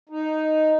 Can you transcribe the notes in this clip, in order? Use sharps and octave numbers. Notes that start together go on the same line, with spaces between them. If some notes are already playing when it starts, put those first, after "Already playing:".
D#4